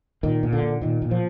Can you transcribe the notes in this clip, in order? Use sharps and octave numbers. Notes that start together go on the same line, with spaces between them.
A#2 D#3
A#2
D3
A#2
A#2 D#3
A#2
F3